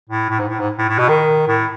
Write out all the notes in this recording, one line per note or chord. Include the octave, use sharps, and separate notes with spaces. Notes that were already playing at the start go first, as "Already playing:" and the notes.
A2
A2
G#2
A2
G#2
A2
A2
B2
D#3
A2